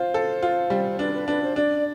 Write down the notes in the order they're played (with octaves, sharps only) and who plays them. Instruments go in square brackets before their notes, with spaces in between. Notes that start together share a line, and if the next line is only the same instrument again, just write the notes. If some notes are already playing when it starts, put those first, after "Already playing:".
Already playing: [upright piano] F4 [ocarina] C5
[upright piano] A4
F4
G3
[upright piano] D4 [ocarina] B4
[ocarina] B4
[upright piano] D4 [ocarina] B4
[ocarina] C5
[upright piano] D4 [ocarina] D5